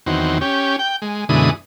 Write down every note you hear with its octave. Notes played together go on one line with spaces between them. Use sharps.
E2 D#3 F#3 C4
C#4 G4
G5
G#3
F#2 B2 D3 E3 G#3 D#6